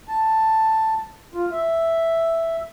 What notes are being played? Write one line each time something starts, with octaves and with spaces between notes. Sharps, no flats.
A5
F4
E5